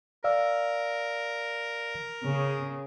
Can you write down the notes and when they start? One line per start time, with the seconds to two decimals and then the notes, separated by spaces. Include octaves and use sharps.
0.24 A#4 D5 F5 E6
2.23 C#3